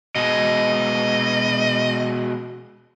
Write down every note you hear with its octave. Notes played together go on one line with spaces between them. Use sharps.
B2 G#3 D#5